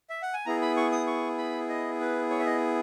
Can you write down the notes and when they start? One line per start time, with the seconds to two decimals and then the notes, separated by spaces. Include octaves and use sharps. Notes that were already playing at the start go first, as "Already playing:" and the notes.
0.10 E5
0.22 F#5
0.33 G#5
0.46 B3 E4 G#4 A#5
0.62 B5
0.77 C#6
0.92 D#6
1.07 C#6
1.38 B5
1.69 D#5
2.00 B4
2.30 C#5
2.39 E5
2.46 D#5